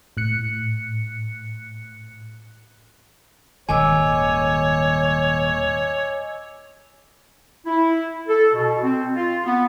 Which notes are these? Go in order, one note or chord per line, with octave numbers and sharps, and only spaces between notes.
A2 F#6 C#7
D#1 G#2 D#3 C#5 D#5 G#5 D6 E6
E4
A4
B2
C4
F4
B3